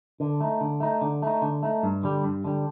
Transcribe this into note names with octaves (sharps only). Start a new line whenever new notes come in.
D3
A3 D#4
D3
A3 D#4
D3
A3 D#4
D3
A3 D#4
G2
D3 G3
G2
D3 G3